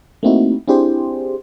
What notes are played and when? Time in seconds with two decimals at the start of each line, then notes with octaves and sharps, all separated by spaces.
0.23 A3 A#3 C4 D#4 E4 F#4
0.68 C4 D4 E4 G4 G#4 C5